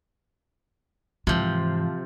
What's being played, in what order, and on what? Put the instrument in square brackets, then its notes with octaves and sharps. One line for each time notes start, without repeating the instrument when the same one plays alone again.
[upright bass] G#2 E3 [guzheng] C3 F3